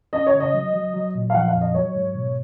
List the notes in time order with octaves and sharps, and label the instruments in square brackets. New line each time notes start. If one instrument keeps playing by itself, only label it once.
[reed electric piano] C#4 [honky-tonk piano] D#5
[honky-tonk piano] C#5
[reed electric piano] C#3
[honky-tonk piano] D#5
[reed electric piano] F#3
F#3
F#3
A#2
[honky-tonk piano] F5
[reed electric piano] F3 [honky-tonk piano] F#5
[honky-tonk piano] F5
[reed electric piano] F2
[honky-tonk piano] D#5
[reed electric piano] F#3 [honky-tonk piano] C#5
[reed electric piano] G#2
B2